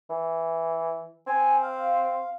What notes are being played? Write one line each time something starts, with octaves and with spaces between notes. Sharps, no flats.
E3
C4 G#5
F5